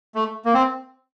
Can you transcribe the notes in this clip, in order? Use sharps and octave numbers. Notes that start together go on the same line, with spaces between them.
A3
A#3
C4